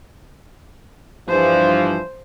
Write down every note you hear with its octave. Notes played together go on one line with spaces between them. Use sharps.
G2 E3 F3 C5